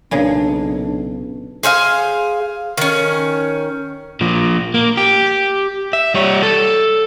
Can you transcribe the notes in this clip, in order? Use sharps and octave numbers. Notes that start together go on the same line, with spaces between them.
B1 A#2 C#3 D4 G#4
G#4 C5 E5 F5
D#3 C#4
A#2 F3
A#3
G4
E5
G3 C#5
A4